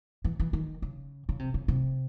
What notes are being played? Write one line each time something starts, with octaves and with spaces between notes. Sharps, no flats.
E3
E3
D#3
C#3
C#3
C3
C#3
C3